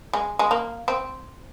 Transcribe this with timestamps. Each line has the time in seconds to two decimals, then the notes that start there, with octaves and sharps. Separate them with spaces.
0.13 G#3
0.39 G#3
0.51 A#3
0.88 C4